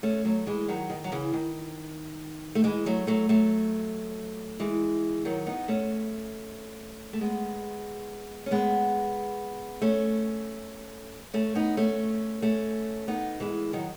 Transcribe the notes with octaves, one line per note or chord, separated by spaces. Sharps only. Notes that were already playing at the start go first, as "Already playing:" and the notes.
A3 C#4
F#3 A3
E3 G#3
D#3 F#3
D#3
F#3
C#3 E3
D#3
A3
E3 G#3
F#3 A3
F#3 A3
F#3 A3
E3 G#3
D#3 F#3
B3 D#4
A3 C#4
A3
G#3 B3
C#4
G#3 B3
A3 C#4
A3 C#4
B3 D#4
A3 C#4
A3 C#4
B3 D#4
E3 G#3
D#3 F#3